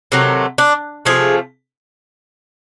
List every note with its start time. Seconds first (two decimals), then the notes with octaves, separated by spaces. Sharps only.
0.12 C3 D#3 F#3 A3
0.58 D4
1.05 C3 F3 A3 G#4